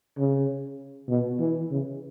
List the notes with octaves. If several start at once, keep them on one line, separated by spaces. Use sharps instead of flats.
C#3
B2
E3
C#3